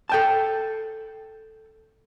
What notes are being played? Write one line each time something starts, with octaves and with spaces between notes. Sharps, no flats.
A4 G5 A5